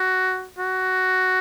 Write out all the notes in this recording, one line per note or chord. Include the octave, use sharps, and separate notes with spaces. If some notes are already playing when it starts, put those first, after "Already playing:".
Already playing: F#4
F#4